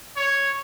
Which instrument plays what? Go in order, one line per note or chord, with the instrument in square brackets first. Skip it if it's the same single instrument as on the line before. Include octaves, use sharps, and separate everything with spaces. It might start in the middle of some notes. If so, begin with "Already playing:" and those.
[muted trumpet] C#5